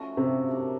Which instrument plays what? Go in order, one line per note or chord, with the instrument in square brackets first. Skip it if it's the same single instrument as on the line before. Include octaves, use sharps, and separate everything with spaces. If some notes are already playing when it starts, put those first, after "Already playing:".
Already playing: [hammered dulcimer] F3 A3 C#4 D#4 F#4
[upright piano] C3
[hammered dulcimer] F#3 A#3 D4